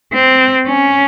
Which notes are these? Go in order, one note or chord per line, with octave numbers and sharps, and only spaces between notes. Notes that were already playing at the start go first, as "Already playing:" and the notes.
C4
C#4